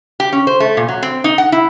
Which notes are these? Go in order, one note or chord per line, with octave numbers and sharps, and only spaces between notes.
G4
C#4
C5
A3
A#2
F#3
C4
D#4
F#5
E4